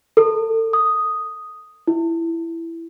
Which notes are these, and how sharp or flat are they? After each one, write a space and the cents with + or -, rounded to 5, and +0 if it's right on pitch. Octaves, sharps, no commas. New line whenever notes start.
A4 +35
D#6 +0
E4 +10